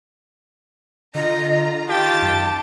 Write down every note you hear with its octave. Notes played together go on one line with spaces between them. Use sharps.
D3 F4 D#5 A#5
D#3 F4 G4 G5 A5 A6
F#2